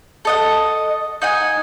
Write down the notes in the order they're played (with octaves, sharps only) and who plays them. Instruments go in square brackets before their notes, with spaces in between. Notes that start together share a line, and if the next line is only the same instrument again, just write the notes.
[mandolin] A4 D#5 F#5
D#4 F#5 G#5